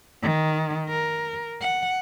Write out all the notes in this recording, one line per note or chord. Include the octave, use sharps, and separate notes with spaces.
D#3
A#4
F#5